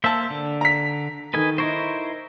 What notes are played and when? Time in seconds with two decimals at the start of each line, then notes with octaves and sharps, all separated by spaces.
0.04 A#3 C5 E5 A5 E6
0.30 D3
0.61 A#5 B6
1.34 D#3 A4 B4 D#5 G#5
1.58 D#4 E4 A#4 C5 C#6